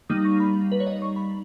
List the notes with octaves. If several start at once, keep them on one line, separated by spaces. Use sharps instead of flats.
G3 A#3 D#4 D#6
C#6
B5
B4
C#5
D#5
C#6
B5